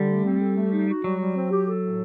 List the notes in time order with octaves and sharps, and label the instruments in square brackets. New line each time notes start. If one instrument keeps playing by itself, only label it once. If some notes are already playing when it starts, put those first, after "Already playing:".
Already playing: [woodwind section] D3 [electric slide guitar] G3
[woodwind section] A3
C4
A4
A3
D#4
F#4
[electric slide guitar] F#3 [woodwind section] G3
[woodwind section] G3
C4
G4
A4
A2